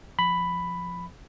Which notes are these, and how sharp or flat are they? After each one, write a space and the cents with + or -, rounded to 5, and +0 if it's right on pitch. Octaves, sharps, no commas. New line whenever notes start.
F3 +0 B5 +5